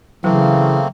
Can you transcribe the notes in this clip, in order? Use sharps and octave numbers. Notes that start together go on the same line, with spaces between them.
C#3 E3 F#3 A3 A#3 C4